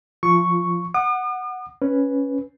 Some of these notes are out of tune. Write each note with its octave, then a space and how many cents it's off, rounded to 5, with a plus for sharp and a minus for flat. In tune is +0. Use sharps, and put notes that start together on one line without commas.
F3 +5 F4 -10 C#6 +0
F#5 +0 D#6 -45
C#4 +0 B4 +0